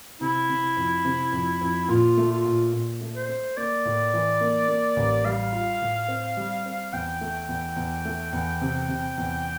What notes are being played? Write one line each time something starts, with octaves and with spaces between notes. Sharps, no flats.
C3 E4
C3
F2
C3
F2
F2
A#2 F4
A3
F4
A#2
A#2
A3
C5
A3
A#3 D5
A2
E3
A#3
A#3
A1
G3 F5
F4
A2
C4
G3
C4
E2 G5
A3
E2
E2
A3
E2
C3
C3
E2